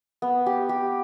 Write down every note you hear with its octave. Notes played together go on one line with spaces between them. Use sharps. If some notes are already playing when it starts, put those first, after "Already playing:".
B3
G4
G4